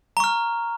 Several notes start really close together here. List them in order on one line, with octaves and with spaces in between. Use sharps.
A#5 C#6 F6